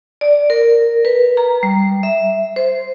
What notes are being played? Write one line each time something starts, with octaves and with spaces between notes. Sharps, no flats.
D5
A#4
B4
A#5
G3
E5
C5